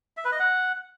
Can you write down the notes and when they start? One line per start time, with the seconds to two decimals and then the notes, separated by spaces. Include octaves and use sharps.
0.17 E5
0.24 B4
0.32 D#5
0.39 F#5